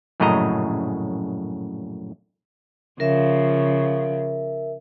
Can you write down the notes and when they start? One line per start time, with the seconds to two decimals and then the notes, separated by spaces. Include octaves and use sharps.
0.20 A#1 F#2 A2 C#3 D#5 A#5
3.00 C#3 F3 A#4 E5